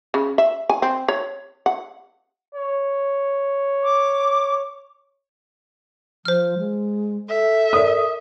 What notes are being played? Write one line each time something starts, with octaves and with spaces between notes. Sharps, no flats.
C#3
E5
G#5
C4
C#5
F#5
C#5
D6
F3 C5 F6
G#3
A4 E5
A#4 D5 D#6